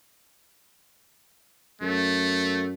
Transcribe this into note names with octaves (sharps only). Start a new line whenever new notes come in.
F#2 A3